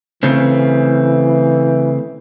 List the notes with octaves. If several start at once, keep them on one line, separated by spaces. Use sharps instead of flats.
C#3 E3 A3 C4